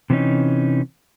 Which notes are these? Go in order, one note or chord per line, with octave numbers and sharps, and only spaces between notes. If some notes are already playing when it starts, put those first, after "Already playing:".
C3 E3 F#3 C4 C#4 D#4